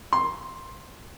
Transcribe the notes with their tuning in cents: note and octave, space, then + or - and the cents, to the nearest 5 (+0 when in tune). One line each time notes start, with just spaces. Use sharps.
C6 +10